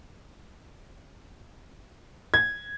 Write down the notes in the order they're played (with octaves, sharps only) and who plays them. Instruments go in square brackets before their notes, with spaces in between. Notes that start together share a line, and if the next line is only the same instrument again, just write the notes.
[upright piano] G#6